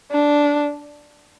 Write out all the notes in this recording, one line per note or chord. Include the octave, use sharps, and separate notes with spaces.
D4